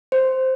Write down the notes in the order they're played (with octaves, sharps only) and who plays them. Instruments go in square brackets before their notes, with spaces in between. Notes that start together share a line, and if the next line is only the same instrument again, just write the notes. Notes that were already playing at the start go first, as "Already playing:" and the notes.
[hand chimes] C5